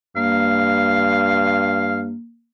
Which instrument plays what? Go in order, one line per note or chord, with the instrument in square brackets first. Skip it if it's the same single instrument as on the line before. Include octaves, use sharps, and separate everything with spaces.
[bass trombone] G2 [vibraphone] A#3 [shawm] F5